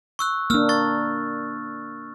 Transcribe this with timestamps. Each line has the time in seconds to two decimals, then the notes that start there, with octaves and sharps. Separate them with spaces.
0.19 C#6 E6 F#6
0.50 A#3 D4 E6 F6
0.69 C#6 A6